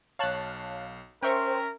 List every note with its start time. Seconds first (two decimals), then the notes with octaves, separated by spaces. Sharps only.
0.19 B1 C#5 F5 A5 F#6
1.22 C#4 A#4 C5 E5 G5 C#6